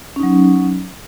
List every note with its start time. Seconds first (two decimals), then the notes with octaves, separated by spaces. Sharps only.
0.16 C#4
0.20 D#4
0.23 F#3